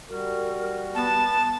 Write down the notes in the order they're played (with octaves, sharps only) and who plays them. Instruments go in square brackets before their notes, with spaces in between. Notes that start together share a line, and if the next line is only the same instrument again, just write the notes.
[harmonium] G3 F#4 [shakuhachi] A#4
[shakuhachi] B3 [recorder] A5